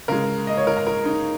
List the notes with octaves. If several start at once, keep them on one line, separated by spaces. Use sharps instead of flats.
C#3 G#3 A#4
D#5
C#5
A#4
A#5
A#4
D#4